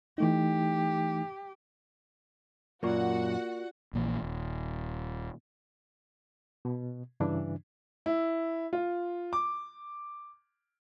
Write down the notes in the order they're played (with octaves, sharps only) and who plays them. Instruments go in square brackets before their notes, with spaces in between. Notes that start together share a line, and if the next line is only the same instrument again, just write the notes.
[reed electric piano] E3 A3 D#4 [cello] G4
[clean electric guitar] F#2 A#2 [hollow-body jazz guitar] A#3 [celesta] F4 D5 C#6 [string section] F#4 F#5
[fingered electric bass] A#1 A#2 D#3 E3
D#1
[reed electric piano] B2
G2 C#3 E3 D4
[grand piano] E4
F4
D6